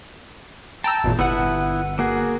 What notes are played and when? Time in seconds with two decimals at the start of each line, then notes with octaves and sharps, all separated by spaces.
0.84 G5 A5 A#5 E6
1.04 G#1 E2 A#2
1.19 G1 B3 E4 B4 F#5
1.99 A#3 F#4 G#4